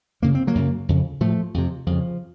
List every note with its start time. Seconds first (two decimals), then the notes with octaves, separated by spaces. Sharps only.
0.22 F#2 C#3 A#3
0.35 C4
0.47 F#3 A#3
0.55 F#2 C#3
0.89 F2 C#3
1.21 A2 F3 A3
1.54 F2 C3
1.86 F2 C#3 F3